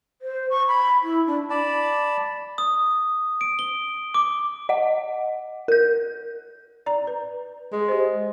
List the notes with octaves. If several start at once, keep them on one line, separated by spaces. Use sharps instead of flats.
C5
C#6
B5
E4
D4
D5 A5 B5
D#6
D7
G7
D6
D#5 F#5
A#4 G6
D5 A#5
B4
G#3
G4 C5